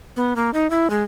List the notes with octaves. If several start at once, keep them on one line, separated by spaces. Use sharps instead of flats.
B3
A#3
D#4
E4
G#3